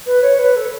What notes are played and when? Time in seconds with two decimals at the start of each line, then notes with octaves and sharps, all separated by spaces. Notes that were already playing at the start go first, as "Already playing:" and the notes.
0.06 B4
0.22 C#5
0.39 B4
0.56 A4